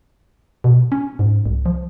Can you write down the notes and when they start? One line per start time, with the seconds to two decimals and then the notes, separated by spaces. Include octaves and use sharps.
0.64 B2
0.92 C#4
1.19 G#2
1.46 C2
1.66 F3